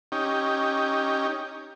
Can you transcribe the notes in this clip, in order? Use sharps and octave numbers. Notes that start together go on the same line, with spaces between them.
C#4 D#4 G4